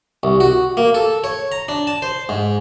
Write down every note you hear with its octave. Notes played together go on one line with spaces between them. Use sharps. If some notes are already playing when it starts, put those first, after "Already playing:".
C2
F#4
A#3
A4
C#5
A#5
D4
A5
C5
G#2